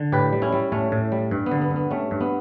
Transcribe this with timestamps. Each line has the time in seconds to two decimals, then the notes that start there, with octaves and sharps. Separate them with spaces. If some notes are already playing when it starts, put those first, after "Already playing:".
Already playing: D3
0.12 A2 G4 B4
0.33 G3
0.42 C#4 E4
0.53 G3
0.72 A2 A3 C#4
0.92 A2
1.12 G3
1.31 G2
1.46 B3
1.51 D3
1.61 B3
1.71 G2
1.76 B3
1.91 G3 A3 C#4
2.11 G2
2.21 B3